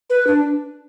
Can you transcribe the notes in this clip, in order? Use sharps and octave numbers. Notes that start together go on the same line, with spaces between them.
B4
D4